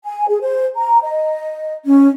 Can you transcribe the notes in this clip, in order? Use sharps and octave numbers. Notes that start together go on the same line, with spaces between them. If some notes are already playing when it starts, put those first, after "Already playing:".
G#5
G#4
C5
A#5
D#5
C#4